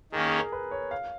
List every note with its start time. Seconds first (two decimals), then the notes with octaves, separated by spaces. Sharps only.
0.12 D#3 G#4
0.15 A#3 C#4
0.26 G#4
0.39 A#4
0.52 B4
0.71 C#5
0.91 F5